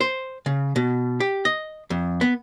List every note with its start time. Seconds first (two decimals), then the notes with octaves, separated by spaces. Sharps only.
0.01 C5
0.46 C#3
0.76 B2
1.20 G4
1.45 D#5
1.90 F2
2.21 B3